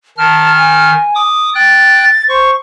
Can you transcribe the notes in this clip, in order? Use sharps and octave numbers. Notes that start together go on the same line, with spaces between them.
D#3 A5 F6
G#5
D6 D#6
G5 F#6 A6
C5 C#6